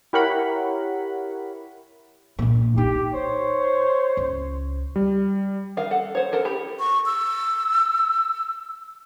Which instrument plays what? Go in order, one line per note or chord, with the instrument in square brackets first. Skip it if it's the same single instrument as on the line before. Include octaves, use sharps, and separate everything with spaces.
[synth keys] E4 G4 A#4 C#5 F#5 B5
[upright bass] A#1 A#2
[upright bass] D#4 [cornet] G4
[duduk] C5 [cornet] C#5
[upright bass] C#2
[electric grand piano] G3
[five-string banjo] D#3 A#4 F5
A4 F#5
C5 C#5
A4 A#4 F#5
E4 G4
[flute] C#6
E6